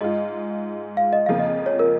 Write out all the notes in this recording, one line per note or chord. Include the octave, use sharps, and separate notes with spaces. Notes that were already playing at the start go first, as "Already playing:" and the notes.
G#2 G#3 F4 D#5
F5
D#5
F2 C#3 F3 A#3 F4 F5
D#5
C#5
A#4